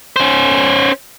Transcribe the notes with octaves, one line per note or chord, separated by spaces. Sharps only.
C#4 C5